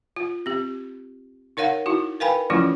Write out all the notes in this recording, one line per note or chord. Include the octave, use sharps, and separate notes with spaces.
F4
C4 G4
D#4 A#4 C#5 F5 F#5
D#4 E4 F#4
A#4 B4 F5 G5 G#5 B5
E3 F3 A3 C#4 E4 F4